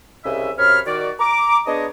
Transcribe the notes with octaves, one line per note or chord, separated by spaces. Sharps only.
C2 C#3 D#5 E5
F#2 C3 C#5 F5 B5 F6
D#3 F#4 D5
A#5 D6
B3 D4 G#4 C#5 D#5